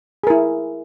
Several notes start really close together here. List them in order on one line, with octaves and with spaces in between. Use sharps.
G#4 A#4 E4